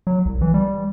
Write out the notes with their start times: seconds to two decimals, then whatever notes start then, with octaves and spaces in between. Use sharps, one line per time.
0.07 F#3
0.25 C2
0.42 E3
0.54 G3